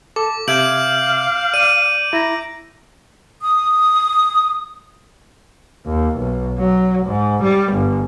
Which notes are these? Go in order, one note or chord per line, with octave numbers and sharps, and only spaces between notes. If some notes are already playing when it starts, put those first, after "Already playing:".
A4 D6
C3 E5 F5 G6 G#6 D7 F#7
D5 D#7
E4 A#5
D#6
D#2
B1
F#3
G#2
G3
G1